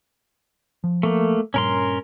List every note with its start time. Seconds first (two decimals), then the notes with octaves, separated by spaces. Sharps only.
0.84 F3
1.03 A3 A#3
1.54 G2 A#2 C#4 A#4 C6